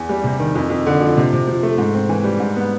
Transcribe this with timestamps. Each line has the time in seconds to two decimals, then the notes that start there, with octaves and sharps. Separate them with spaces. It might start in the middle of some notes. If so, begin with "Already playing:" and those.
Already playing: E2
0.09 G3
0.24 C3
0.39 D#3
0.55 F2
0.70 F2
0.86 D3
1.01 F3
1.17 C3
1.33 C3
1.47 F3
1.63 A3
1.78 G#2
1.94 C4
2.09 E3
2.24 G3
2.40 G#2
2.56 B3